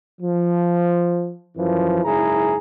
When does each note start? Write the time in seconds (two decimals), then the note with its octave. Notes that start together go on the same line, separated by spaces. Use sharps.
0.21 F3
1.56 F#2 E3 F3
2.04 F#1 G#2 E4 G#4 A#5